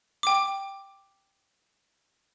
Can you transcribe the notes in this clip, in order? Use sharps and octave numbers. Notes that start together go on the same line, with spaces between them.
G5 D6